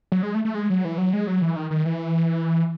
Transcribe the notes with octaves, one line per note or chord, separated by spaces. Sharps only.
F#3
G#3
A3
A3
G#3
F#3
E3
F#3
G#3
F#3
E3
D#3
D#3
E3